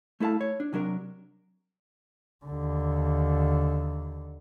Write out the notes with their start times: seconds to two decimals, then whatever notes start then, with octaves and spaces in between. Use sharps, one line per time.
0.20 A3 E4 A4 F5 A5
0.41 C#5
0.60 D4
0.73 C3 F#3 D4 A#4
2.45 D#2 D3